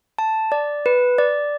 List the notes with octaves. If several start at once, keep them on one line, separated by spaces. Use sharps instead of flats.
A5
D5
B4
D5